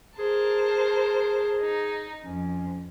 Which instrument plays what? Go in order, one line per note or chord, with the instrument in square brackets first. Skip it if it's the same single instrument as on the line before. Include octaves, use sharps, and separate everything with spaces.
[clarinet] G#4 [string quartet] A#4 C5 A5
[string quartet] D#4
[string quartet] F2 [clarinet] C#4